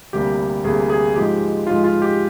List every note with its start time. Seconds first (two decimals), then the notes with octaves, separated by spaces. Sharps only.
0.13 D2 C3 G3 A#3 G4
0.64 D2 C3 G3 A#3 G#4
0.90 G#4
1.16 G#2 F3 G#3 G4
1.66 G#2 F4
1.70 F3 G#3
1.84 F4
2.02 G4